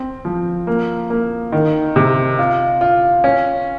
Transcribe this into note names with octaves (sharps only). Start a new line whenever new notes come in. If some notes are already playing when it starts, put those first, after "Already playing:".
Already playing: C4
F3
A#3
A#3
D#3
C3
F4
F4
C#4